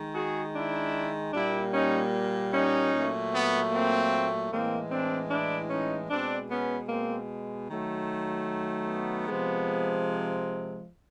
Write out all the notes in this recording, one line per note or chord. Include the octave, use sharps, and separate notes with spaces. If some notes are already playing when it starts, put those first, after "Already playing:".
Already playing: D#3 G#3
F#4 G#4
D4 E4
A#2 G3 A#3 D4 E4
C#4 D#4
C#4 D#4
A#2 F#3 A3
B3
A#3 C4
A2 E3 G#3 A#3 C4
C4 D4
D4 E4
C#4 D#4
B2 G#3 C4 D4
B3 C#4
A#3 C4
D#3 F#3 A3
B3
C3 F3 G#3